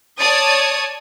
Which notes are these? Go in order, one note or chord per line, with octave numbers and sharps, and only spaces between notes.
C#5 D5 A5 D#6 G#6